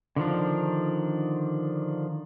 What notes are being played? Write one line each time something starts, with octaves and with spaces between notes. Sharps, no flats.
D3 D#3 F3 D4